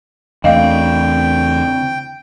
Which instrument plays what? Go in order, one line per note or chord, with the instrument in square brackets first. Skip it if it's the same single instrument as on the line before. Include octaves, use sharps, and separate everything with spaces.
[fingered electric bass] E2 A3 [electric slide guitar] C#3 C4 D4 [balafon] D#5 F5 [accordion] G5